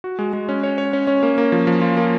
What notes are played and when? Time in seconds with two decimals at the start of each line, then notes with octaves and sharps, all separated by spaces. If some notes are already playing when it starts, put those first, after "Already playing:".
0.04 F#4
0.19 G#3
0.33 G#3
0.49 C#4
0.63 C#5
0.78 C#5
0.93 C#4
1.07 C#4
1.23 A#3
1.38 A#3
1.52 F3
1.67 F3
1.81 F4
1.97 A#3